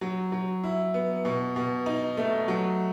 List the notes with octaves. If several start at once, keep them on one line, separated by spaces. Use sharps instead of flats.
F#3
F#3
E4
B3
B2
B2
D#4
A3
F#3